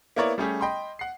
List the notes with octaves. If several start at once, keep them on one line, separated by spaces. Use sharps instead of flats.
A#3 B3 E4 A#4 C#5 D5
G3 A3 C#4 G4 G#4
D#5 G5 B5 C6
F#5 C7